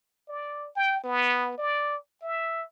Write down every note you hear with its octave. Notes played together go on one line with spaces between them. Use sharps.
D5
G5
B3
D5
E5